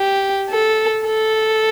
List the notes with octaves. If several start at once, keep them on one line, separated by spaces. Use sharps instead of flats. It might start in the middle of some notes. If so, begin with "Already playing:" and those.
Already playing: G4
A4
A4